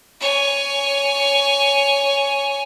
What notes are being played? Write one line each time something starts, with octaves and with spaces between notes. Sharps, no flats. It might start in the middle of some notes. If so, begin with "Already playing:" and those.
C#5 G#5